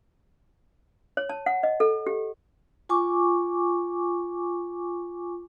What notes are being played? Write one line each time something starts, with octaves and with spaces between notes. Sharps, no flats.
C#5
A5
F#5
D#5
A4
G4
F4 G#5 C#6 D6